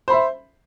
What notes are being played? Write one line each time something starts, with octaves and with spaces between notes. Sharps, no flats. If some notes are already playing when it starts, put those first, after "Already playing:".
C5 E5 B5